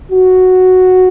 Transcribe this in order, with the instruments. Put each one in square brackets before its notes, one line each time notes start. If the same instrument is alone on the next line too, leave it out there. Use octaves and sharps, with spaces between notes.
[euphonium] F#4